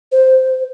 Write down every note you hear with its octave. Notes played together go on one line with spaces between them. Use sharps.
C5